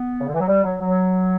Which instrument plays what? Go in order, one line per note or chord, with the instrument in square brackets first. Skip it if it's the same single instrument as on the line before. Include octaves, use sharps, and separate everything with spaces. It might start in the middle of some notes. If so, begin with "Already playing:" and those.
Already playing: [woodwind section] B3
C#3
D3
E3
F#3
G3
F#3
F#3